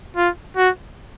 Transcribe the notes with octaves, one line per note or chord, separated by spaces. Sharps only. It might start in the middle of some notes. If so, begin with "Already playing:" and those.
F4
F#4